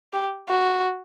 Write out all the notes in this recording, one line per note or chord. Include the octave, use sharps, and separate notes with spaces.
G4
F#4